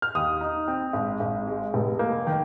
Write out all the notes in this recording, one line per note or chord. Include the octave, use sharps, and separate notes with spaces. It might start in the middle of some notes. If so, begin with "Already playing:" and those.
F6
D#2 D#6
D#4
C4
G#1
G#1
G#3
F1
A#3
D#3